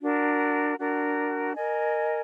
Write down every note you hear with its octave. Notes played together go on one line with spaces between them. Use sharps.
D4 F#4 A#4
D4 F#4 A#4
A#4 D#5 G#5